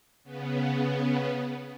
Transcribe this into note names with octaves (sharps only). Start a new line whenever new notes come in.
C#3 B3